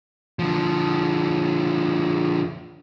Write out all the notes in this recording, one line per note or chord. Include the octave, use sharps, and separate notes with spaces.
D3 F3